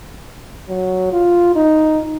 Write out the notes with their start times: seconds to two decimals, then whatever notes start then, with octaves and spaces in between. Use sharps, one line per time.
0.69 F#3
1.13 F4
1.56 D#4